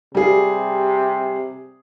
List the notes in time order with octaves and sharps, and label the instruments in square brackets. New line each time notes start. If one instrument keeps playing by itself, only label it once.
[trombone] C3 [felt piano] G3 G#4